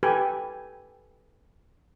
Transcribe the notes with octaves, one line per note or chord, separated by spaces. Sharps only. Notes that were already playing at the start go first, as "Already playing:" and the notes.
G4 A4 B4 G#5